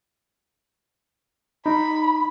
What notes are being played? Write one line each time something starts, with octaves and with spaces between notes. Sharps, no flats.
D#4 B5